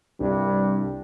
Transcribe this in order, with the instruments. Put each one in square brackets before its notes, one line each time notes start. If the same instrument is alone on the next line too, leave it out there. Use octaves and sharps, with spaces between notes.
[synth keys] C2 [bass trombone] G2